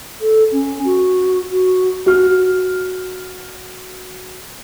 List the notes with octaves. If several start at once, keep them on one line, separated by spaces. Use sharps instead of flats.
A4
C#4
F#4
F#4
F#4 F6